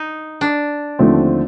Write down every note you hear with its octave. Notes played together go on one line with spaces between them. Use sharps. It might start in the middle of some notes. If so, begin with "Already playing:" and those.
Already playing: D#4
D4
D#2 D3 F3 A3 C4